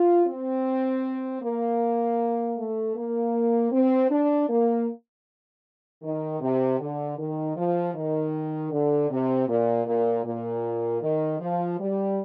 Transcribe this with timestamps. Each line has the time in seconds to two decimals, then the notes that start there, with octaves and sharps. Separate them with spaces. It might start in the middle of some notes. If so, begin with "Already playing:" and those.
Already playing: F4
0.26 C4
1.42 A#3
2.56 A3
2.95 A#3
3.71 C4
4.10 D4
4.49 A#3
6.02 D#3
6.41 C3
6.79 D3
7.18 D#3
7.56 F3
7.95 D#3
8.71 D3
9.10 C3
9.48 A#2
9.86 A#2
10.24 A#2
11.01 D#3
11.40 F3
11.79 G3